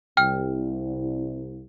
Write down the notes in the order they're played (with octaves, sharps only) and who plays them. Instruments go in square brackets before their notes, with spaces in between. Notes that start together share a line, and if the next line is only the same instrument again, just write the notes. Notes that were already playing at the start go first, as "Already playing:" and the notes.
[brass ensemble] C2 [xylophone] G5 F6